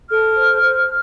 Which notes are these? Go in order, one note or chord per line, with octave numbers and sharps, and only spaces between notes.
A4 F6
C5
C5